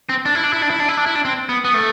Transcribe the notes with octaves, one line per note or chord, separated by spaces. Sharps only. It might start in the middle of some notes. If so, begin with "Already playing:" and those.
C4
D4
E4
D4
E4
D4
E4
D4
E4
D4
E4
D4
C4
B3
B3
A3